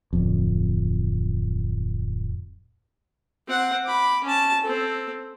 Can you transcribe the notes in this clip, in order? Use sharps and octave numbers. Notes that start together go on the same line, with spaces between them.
D1 F2
C4 F#5
B5 D6
C#4 A5
C4 A4